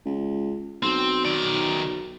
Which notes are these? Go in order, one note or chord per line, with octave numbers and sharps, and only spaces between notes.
C#2
B1 C4
D#3 D5